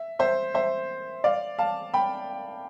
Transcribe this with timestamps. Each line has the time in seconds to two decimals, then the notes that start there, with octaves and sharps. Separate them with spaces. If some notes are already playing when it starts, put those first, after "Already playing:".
Already playing: E5
0.19 C5 E5
0.54 C5 E5
1.24 D5 F5
1.58 F5 A5
1.94 G5 B5